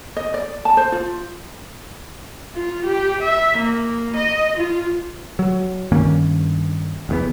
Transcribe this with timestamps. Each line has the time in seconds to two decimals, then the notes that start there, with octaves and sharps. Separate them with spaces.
0.17 D#5
0.34 D5
0.65 A5
0.77 C5
0.92 F4
2.55 F4
2.86 G4
3.21 E5
3.58 A#3
4.16 D#5
4.57 F4
5.39 F#3
5.92 G2 D#3 A#3 C#4
7.09 F1 E2 B3